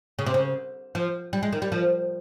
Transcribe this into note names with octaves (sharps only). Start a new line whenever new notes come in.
C#3
C3
C#3
F3
G3
G#3
D#3
G3
F3